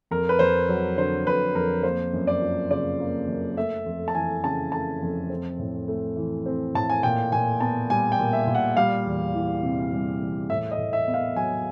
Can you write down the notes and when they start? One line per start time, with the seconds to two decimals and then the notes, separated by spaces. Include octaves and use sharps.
0.11 F2 A#4
0.29 B4
0.39 F2 C5
0.69 F#3
0.97 D3 C5
1.26 F2 B4
1.55 F2 A#4
1.83 A#3 C5
2.13 F#2
2.27 D5
2.42 F3
2.70 C#3 D5
3.00 A#3
3.29 F#2
3.57 A3 E5
3.86 F2
4.08 A5
4.15 E3 G#5
4.44 C#3 A5
4.72 A3 A5
5.02 F2
5.30 C4
5.59 A2
5.88 A3
6.16 E3
6.46 C4
6.75 A2 A5
6.90 G#5
7.03 A#2 G5
7.32 A#2 G#5
7.60 B3 A5
7.90 G3 G#5
8.12 G5
8.19 A#2
8.33 E5
8.47 A#2
8.55 F#5
8.77 G3 F5
9.05 E2
9.34 E3
9.63 C3
9.92 G3
10.21 E2
10.49 A2 E5
10.71 D#5
10.78 A2
10.93 E5
11.08 B3
11.14 F5
11.36 F#3 G#5